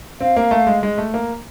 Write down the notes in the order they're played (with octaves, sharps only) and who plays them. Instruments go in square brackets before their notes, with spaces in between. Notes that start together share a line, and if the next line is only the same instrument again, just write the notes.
[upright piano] C4 [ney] F5
[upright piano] A#3
A3
G#3
G#3
A3
A#3